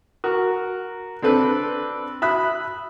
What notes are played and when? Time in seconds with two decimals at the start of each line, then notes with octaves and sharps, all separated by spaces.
0.24 F#4 A#4
1.22 C4 D4 A4 B4
2.22 E5 B5 D#6 F#6